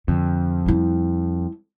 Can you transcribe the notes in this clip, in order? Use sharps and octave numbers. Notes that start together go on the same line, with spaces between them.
F2 D3
G3 E4